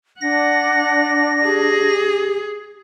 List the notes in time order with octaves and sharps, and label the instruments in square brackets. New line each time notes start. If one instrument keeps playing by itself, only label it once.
[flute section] D4 [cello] F#5 [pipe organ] A#6
[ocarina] G4 [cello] G#4